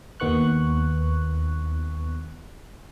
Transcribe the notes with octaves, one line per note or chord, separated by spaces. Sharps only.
D#2 D#3 B3 C#6 F#6